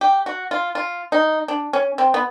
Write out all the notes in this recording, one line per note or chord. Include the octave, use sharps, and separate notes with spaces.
G4
F#4
F4
F4
D#4
D4
C#4
C4
B3